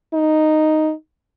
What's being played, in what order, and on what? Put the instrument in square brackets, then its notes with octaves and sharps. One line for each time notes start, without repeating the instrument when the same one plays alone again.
[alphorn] D#4